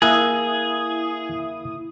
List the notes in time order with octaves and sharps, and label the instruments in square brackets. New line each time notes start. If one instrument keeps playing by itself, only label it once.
[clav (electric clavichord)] A#3 [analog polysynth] E4 D#6 [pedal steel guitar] G#4 [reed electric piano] G#5 E6 F#6